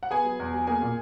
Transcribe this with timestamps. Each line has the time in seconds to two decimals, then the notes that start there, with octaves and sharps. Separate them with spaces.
0.03 F#5
0.11 B3 G#4 G#5
0.25 F#3
0.40 E2
0.54 F#3
0.67 A#3 G#4 G#5
0.82 A#2